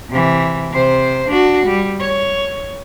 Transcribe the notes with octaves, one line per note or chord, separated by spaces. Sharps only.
C3 E3
C3 C5
D4 F#4
G3
C#5